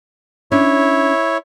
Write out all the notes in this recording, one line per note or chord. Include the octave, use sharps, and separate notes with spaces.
C#4 D4 E4 C#5